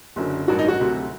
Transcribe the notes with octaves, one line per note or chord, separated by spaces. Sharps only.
F#1 F#2 D3 F#3
A1 G2 D#3 F#3 F#4
D#4
F#4
D2 C3 F#3